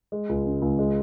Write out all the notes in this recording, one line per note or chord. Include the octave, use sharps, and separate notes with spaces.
G#3
C#2
C#3
C#2
G#3